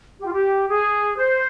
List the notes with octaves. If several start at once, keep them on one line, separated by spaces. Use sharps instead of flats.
G4
F4
G4
G#4
C5